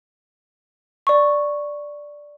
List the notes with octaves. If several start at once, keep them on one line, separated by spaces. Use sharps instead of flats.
D5 C#6